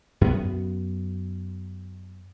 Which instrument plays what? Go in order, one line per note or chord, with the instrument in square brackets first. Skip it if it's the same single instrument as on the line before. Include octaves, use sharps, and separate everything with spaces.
[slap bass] F#2 B3